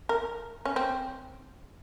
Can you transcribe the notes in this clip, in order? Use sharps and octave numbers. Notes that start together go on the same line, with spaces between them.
A#4
C#4
C4